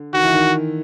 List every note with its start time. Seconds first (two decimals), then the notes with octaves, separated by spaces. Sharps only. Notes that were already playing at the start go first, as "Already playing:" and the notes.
Already playing: D3
0.13 D#3 F#4
0.23 E3
0.34 D#3